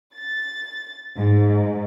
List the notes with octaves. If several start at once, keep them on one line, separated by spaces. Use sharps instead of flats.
A6
G#2